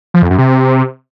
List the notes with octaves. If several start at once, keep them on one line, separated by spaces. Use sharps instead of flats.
F3
F2
F#2
C3